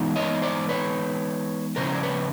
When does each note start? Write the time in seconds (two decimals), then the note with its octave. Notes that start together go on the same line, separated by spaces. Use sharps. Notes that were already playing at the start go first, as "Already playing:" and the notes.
Already playing: E3 G#3 B3 D#4
0.16 C#5 D#5
0.42 C5 D5
0.69 B4 C#5
1.76 C#3 F3 C#4 A#4 C5
1.95 D5
2.03 B4 C#5